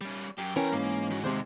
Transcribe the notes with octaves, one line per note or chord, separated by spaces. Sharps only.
G3 C#4
F#2 G4
E3 B3 C#4 A#4 G5
G#2 A#3
D#3 F#4
D#2 C3 G#3 G#4 C5